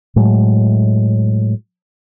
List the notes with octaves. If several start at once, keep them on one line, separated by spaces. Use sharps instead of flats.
A2 F#3 G#3 A3